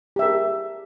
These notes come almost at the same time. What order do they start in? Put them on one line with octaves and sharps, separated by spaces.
G4 E5 A#4 G#4